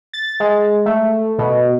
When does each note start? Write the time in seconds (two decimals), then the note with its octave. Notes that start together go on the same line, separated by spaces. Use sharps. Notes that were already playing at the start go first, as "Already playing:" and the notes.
0.13 A6
0.40 G#3
0.86 A3
1.38 B2